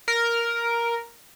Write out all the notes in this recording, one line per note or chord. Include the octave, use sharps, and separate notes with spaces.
A#4